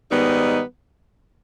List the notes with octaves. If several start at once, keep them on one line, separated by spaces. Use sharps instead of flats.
G#2 D#3 G3 B3 D#4